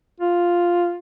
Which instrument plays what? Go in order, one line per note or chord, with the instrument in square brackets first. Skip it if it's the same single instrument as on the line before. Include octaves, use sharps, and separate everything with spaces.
[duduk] F4